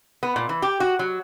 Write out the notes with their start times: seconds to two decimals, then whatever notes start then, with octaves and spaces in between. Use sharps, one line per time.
0.23 B3
0.36 A#2
0.49 E3
0.62 G4
0.80 F#4
0.99 F#3